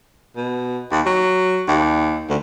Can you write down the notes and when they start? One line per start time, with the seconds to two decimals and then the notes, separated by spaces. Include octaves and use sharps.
0.37 B2
0.92 D#2
1.06 F#3
1.68 D#2
2.29 D2